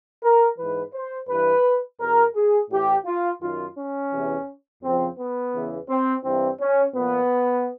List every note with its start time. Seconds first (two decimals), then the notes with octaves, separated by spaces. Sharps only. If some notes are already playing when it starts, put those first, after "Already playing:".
0.23 A#4
0.57 G#2 E3 B4
0.93 C5
1.29 G2 E3 B4
1.99 E2 B2 A#4
2.35 G#4
2.70 A2 E3 G4
3.05 F4
3.41 F#2 D#3 F4
3.76 C#4
4.12 E2 C3 E3
4.82 F2 C#3 F3 C4
5.18 B3
5.54 E2 C#3 E3
5.89 C4
6.24 G2 E3 C4
6.59 C#4
6.95 A#2 F3 B3